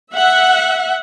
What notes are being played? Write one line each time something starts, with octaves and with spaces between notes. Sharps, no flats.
E5 F#5